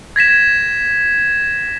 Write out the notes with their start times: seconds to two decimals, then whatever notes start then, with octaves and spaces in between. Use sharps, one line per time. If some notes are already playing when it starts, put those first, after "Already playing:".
0.16 G#6 A#6 B6 E7